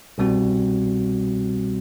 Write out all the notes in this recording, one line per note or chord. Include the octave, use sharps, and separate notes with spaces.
C2 B2 G3 C4 F#4